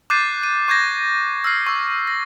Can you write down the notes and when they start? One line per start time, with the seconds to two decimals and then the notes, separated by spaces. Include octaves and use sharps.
0.10 D6 F#6 G6 A6 C7 D#7
0.43 D#7
0.68 C#6 G6 G#6 A#6
1.44 E6 F6 C7
1.67 C#6 E6
2.07 A#6